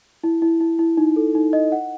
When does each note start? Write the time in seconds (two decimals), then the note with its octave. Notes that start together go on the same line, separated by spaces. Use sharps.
0.24 E4
0.42 E4
0.60 E4
0.79 E4
0.97 D#4
1.16 A4
1.35 D#4
1.53 D#5
1.72 F#5